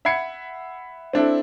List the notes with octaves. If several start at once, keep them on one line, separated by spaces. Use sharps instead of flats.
E5 F#5 B5 G#6 C7 C#7
C4 D4 E4 A4